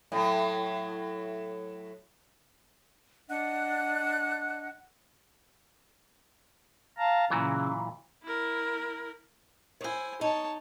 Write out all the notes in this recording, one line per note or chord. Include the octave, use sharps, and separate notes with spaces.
A2 F#3
D4 D#5 F#5 F#6
F5 A5 A#5
A#2 C#3 E3 F#3
E4 A#4
E4 C5 C#5 G#5
D#4 C#5 A5